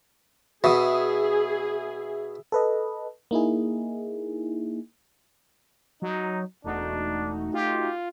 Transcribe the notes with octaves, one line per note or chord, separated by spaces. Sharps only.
B2 G#4 E5 D#6
A4 B4 D#5
A#3 D#4 E4 G#4
F#3 D#4
E1 A3 D4 D#4 F#4
F4 G4